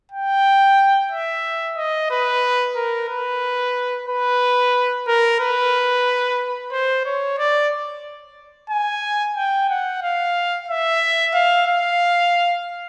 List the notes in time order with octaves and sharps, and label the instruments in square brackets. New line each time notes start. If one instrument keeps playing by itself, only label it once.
[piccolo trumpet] G5
E5
D#5
B4
A#4
B4
B4
A#4
B4
C5
C#5
D5
G#5
G5
F#5
F5
E5
F5
F5